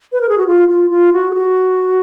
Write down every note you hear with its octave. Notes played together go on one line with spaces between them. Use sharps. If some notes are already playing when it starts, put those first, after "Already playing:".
B4
A#4
G#4
F#4
F4
F4
F4
F#4
G#4
F#4